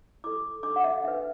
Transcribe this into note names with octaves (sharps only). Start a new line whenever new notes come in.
E4 A4 D6
D4 A4 D6
F#5
E5
D4 B4 E5